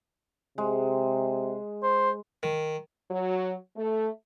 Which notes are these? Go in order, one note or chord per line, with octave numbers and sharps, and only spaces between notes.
C3 G#3
C5
D#3
F#3
A3